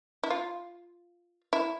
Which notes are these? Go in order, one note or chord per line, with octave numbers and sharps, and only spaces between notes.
E4
F4
E4